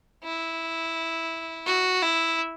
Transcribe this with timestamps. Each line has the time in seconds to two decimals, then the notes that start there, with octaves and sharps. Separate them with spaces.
0.23 E4
1.66 F#4
2.03 E4